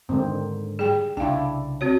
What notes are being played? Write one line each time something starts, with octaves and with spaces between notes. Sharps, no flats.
G#2 D3 D#3 C4
G3 G#4 G5
C2 C#3 D4 E4 F5 G5
C4 F#4 C#5